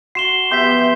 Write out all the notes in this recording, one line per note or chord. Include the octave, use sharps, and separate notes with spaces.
F#4 F#5 C6 C7 E7 G7
E3 F3 B3 G4 E5 C6 G6 B6